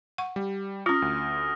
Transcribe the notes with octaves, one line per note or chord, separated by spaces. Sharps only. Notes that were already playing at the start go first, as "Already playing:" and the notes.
F#5 C#6
G3
C#4 F4 D#6 F6 A#6
D2